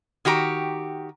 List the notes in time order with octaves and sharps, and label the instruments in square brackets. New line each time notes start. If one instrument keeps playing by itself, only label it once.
[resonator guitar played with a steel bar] D#3 F#4 G4 A#5